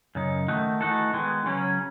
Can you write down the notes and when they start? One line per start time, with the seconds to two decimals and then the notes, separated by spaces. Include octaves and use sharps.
0.15 F#2 C#3 D#4
0.48 D#3 A3 D#4 F#4
0.81 E3 A3 D#4 F#4 A4
1.14 D#3 G#3 B3
1.46 C#3 F#3 C#4